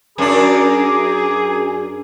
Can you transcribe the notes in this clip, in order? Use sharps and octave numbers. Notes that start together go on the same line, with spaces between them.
F#2 D4 G#4 A#5 D6